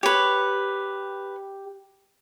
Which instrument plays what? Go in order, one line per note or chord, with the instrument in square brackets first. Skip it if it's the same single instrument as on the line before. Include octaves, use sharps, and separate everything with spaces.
[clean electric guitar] G4 [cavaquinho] B4 C#5